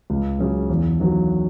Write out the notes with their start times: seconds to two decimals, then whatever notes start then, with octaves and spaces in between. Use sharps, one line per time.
0.10 C#2
0.39 C#3 F#3
0.70 E2
1.00 D#3 F#3